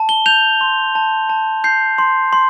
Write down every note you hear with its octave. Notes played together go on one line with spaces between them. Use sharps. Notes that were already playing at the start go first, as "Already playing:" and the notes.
Already playing: A5
G7
G6 F7
C6
A5
A5
G6 C7
C6
C6